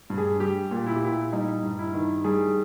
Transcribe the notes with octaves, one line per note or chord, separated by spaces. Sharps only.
G2
G#4
G3 G4
A#2
E4
G4
A#2 E4
G3 D#4
G2
E4
D#3
G3 G#4